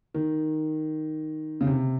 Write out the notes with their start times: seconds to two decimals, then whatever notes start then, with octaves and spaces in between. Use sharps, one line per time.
0.14 D#3
1.61 C#3
1.67 C3